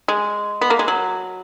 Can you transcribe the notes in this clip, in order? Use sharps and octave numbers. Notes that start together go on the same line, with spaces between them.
G#3
B3
A#3
G#3
F#3